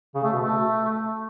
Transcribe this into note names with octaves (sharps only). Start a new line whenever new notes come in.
C#3
A3
B2
A3